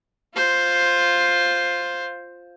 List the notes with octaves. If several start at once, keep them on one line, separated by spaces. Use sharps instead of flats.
F4 C5